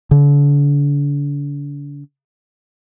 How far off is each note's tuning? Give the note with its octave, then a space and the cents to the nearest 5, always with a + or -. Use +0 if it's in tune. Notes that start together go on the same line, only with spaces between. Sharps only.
D3 -40